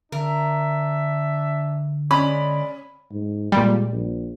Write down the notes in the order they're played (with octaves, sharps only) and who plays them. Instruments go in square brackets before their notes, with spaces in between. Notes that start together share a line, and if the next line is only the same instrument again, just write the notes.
[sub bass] D3 [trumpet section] D4 E5 [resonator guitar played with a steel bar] A#4
[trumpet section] G#3 D5 [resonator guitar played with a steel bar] C#4 [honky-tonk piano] B5
[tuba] G#2
[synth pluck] A#2 G3 [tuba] G#3
[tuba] A#1